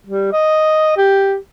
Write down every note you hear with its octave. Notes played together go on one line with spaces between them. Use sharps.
G3
D#5
G4